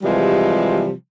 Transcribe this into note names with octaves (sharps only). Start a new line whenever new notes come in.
C3 E3 F3 G3 G#3